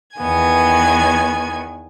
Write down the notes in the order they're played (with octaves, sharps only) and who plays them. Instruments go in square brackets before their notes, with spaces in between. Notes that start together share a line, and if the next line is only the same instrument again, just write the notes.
[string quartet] E2 D#3 B3 G#5 G#6